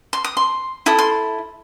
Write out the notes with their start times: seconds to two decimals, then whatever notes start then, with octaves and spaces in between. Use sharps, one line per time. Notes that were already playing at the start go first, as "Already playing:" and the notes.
0.13 C6
0.24 D#6
0.37 C6
0.86 E4 A4 D#6
0.99 C6